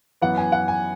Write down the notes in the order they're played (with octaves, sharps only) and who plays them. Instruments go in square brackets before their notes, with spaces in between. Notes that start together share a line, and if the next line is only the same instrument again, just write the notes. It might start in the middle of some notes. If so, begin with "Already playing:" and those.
[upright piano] F#2 E3 B3 F#5
G#5
F#5
G#5